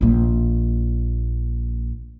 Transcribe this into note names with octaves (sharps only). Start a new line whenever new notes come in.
A#1 A#3